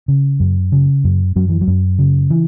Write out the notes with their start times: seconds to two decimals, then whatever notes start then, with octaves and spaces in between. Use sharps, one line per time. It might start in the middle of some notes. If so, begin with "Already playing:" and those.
0.08 C#3
0.40 F#2
0.72 C#3
1.04 F#2
1.36 F#2 F#3
1.49 E3
1.61 F#3
1.67 F#2
1.99 C#3
2.30 E3